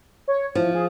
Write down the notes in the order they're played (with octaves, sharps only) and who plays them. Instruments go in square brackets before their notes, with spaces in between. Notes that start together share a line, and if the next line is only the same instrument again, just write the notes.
[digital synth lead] C#5
[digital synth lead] E3 [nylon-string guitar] F3
[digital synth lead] G#4